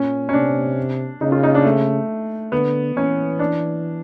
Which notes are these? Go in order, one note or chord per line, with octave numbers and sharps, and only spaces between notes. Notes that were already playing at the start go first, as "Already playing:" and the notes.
Already playing: A#2 C#4
C#4
C3 D4
C#3 D#4
F4
D#4
D4
A3
D3 B3
E3 C#4
D4